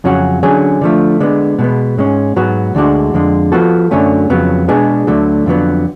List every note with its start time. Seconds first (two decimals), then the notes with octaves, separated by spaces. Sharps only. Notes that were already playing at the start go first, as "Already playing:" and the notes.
0.04 F2 C#3 F#3 C#4 F#4
0.43 D3 F#3 C#4 G#4
0.81 D3 F3 A3
1.20 D3 G#3 B3
1.59 B2 G#3 B3
1.98 G#2 G#3 C#4
2.36 G#2 F#3 B3 F#4
2.75 D2 D3 G#3 D4 F#4
3.14 F2 D3 G#3
3.52 F3 B3 F#4 A4
3.91 F#2 D3 F#3 A3 C#4
4.30 F2 C#3 F#3 B3
4.68 B2 G#3 B3 D4 G#4
5.07 D2 D3 F#3 A3
5.46 F2 D3 F#3 B3